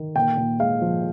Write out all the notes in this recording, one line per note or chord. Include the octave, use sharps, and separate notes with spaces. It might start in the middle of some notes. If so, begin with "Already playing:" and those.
Already playing: D#3
A#2 G5
A#2
G#3 F5
F3